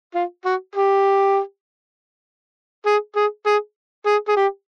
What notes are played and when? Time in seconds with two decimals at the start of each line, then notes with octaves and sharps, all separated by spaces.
0.15 F4
0.45 F#4
0.75 G4
2.86 G#4
3.16 G#4
3.46 G#4
4.06 G#4
4.28 G#4
4.36 G4